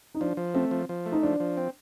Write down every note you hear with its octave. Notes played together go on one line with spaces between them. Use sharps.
D#4
F3 D4
F3
A3 C4
F3
F3
A3
D#4
F3 D4
F3
C4